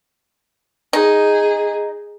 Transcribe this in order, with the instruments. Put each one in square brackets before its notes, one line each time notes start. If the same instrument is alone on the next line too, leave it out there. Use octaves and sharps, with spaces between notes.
[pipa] D#4 [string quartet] G#4